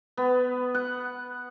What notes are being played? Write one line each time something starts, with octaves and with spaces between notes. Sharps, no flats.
B3
F#5